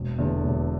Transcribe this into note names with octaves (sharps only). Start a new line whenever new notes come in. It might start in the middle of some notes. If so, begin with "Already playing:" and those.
Already playing: E1
E2 D3
E1